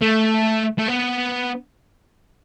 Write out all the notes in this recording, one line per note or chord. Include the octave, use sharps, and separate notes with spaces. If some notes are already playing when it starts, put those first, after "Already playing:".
A3
A3
B3